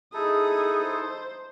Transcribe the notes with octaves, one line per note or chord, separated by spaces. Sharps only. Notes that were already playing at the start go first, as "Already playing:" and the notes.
D#4 E4 G#4 A4 D#6
C5